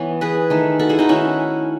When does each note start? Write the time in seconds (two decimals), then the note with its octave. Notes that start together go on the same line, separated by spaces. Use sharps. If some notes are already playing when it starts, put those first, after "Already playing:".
Already playing: E3 B3 C#5
0.21 G#4 B4
0.50 D#3 A3
0.79 F#4 A4
0.89 E4 G#4
0.99 D#4 F#4
1.09 D#3 A3 C#4 E4